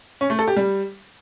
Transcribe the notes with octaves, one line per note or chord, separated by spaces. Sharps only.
C#4
A3
A4
G4
G3